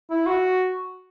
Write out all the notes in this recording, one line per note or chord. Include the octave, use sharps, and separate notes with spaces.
E4
F#4